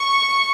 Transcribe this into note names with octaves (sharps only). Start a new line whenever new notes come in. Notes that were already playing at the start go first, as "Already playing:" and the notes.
Already playing: C#6